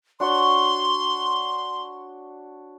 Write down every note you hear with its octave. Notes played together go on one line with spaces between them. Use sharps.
D4 F#4 C#5 C6